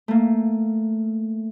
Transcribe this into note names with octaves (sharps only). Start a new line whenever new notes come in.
A3 A#3